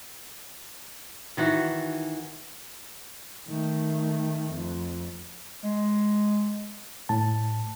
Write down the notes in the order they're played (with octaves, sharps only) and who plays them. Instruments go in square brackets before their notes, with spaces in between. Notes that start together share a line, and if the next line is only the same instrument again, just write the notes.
[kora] D#3 E3 F#4
[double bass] D#3 A3
F2
[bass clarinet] G#3
[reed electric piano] A2 A5